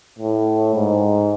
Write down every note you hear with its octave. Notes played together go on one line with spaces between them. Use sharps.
A2
G#2